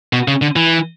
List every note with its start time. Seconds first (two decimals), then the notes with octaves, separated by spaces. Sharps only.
0.13 B2
0.28 C#3
0.42 D3
0.56 E3